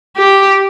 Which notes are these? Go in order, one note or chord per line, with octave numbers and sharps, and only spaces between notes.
G4